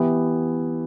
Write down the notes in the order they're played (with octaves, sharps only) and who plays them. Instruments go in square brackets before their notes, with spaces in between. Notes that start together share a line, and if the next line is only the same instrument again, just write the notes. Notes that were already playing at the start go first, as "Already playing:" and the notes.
Already playing: [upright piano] E3 B3 E4 G4